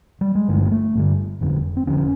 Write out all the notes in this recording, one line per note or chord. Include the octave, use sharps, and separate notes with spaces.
G3
G#3
G1 G2 D3 A3
A#3
A3
G1 G2 D3
F1 F2 D3
C4
F1 F2 D3 C#4